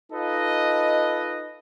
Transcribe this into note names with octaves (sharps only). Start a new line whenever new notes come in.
D#4 F4 A4 B4 D#5